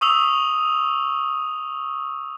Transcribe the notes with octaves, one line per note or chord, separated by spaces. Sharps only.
C#6 D#6 E6 F7